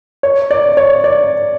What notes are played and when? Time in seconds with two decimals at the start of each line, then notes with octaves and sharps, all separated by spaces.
0.23 C#5
0.51 D5
0.77 C#5
1.04 D5